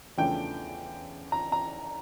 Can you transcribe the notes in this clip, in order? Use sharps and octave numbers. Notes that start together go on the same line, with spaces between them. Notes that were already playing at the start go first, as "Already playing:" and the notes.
E2 C#3 F3 A3 D4 G5
A#5
A#5